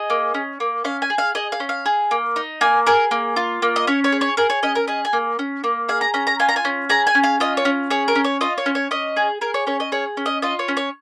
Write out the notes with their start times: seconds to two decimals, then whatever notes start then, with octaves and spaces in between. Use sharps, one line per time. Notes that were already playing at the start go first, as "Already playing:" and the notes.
Already playing: G#4 D#5
0.10 A#3
0.34 C#4
0.60 A#3
0.84 C#4 F5
1.02 G#5
1.10 G#4
1.18 F5
1.35 G#4 D#5
1.52 F5
1.60 C#4
1.69 F5
1.86 G#4
2.11 A#3
2.36 D#4
2.61 A#3 G#5
2.86 G#4 A#4
3.11 A#3
3.36 F4
3.62 A#3
3.76 D#5
3.87 C#4 C#5
4.04 C#5
4.12 G#4
4.21 C#5
4.37 G#4 A#4
4.50 C#5
4.63 C#4 D#5
4.75 A#4
4.88 G#4 D#5
5.05 G#5
5.13 A#3
5.39 C#4
5.64 A#3
5.89 G#4 F5
6.01 A#5
6.14 C#4 A#5
6.27 A#5
6.39 F4 G#5
6.49 A#5
6.56 G#5
6.65 C#4
6.89 G#4 A#5
7.07 G#5
7.15 C#4
7.24 F5
7.40 F4 D#5
7.57 C#5
7.65 C#4
7.90 G#4 C#5
8.08 A#4
8.15 C#4
8.24 C#5
8.41 F4 D#5
8.58 C#5
8.66 C#4
8.75 C#5
8.91 C#4 D#5
9.17 G#4
9.41 G#4 A#4
9.54 C#5
9.67 C#4 C#5
9.80 D#5
9.92 G#4 C#5
10.17 C#4
10.26 D#5
10.42 F4 D#5
10.59 C#5
10.68 C#4
10.77 C#5